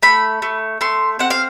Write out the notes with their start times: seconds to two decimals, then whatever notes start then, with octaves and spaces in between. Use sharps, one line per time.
0.03 A3 B5
0.42 A3
0.81 A3 C6
1.19 C4 F#5
1.30 F5